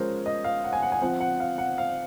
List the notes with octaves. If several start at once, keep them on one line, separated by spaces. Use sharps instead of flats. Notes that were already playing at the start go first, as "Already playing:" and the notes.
Already playing: F3 G#3 C#4 A#4 C5
D#5
F5
F#5
G#5
F#5
G#5
F3 C4 F#5
F#5
F5
F#5
F5